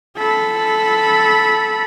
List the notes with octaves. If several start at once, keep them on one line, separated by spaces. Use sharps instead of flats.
A4 B5